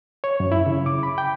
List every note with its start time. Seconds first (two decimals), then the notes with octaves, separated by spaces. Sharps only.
0.24 C#5
0.40 F#2
0.52 E4
0.66 C#3
0.86 D6
1.03 B5
1.18 G5